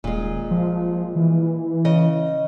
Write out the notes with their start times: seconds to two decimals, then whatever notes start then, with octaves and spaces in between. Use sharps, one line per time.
0.04 D#1 A#2 G#3
0.51 F3
1.16 E3
1.85 C#3 D#5